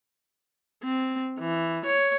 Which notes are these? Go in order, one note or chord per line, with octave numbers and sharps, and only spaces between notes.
C4
E3
C#5